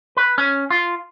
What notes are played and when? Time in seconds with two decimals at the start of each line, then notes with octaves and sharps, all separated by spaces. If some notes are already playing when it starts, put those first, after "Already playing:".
0.17 B4
0.38 C#4
0.70 F4